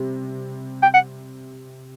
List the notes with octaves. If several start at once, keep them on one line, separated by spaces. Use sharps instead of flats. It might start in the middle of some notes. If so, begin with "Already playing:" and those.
Already playing: C3 G3
G5
F#5